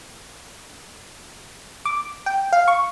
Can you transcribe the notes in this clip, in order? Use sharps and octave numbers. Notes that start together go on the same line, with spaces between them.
D6
G5
F5
C#6